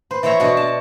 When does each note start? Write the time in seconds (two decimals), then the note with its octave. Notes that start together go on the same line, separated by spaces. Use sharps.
0.11 B4 C5
0.23 E3 C5 C#5 E5 A#5
0.40 B2 D4 F#4
0.57 A5